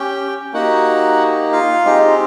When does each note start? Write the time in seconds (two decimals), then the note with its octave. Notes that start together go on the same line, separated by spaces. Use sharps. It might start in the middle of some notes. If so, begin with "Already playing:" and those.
Already playing: C#4 G4 G5
0.53 A#3 D#4 F#4 G4 F#5
1.52 F4 F5
1.85 G#3 C4 D#4 G4